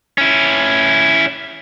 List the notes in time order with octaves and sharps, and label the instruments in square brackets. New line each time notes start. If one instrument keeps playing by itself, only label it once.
[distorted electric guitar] C#4 E4